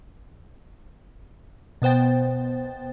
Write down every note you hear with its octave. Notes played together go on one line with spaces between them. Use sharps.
B2 B3 C5 G5 A6